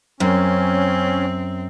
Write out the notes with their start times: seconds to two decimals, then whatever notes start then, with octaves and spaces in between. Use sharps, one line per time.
0.20 F#2 C4 C#4